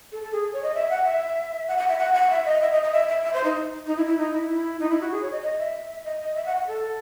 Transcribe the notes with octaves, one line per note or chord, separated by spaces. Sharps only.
A4
A4
G#4
C#5
D#5
E5
F#5
E5
F#5
F#5
E5
F#5
F#5
E5
D#5
E5
D#5
D#5
E5
E5
E5
C5
D#4
D#4
E4
E4
D#4
E4
E4
D#4
E4
F#4
G#4
C#5
D#5
D#5
E5
D#5
D#5
E5
F#5
F#5
A4